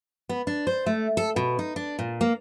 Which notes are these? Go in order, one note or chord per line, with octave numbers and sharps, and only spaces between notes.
B3
D4
C5
A3
A4
B2
D#4
D4
A#2
A#3